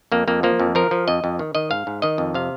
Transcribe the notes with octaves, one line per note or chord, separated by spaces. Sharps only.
F2 A#3
F2 A#3
F3 A#3
F2
F3 A#4
F3
F2 D#5
F2
D#3
D#3 D#5
G#2 F5
G#2
D#3 D#5
F2
C3 F5